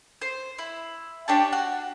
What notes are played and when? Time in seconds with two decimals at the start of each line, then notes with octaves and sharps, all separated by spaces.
0.22 C5
0.59 E4
1.28 D4 G4 C#5 A5
1.53 F#4